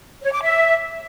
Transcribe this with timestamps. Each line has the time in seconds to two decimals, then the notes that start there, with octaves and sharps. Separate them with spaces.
0.22 C#5
0.32 D6
0.43 E5